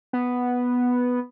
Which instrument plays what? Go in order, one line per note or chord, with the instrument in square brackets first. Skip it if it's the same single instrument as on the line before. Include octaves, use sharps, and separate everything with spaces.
[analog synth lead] B3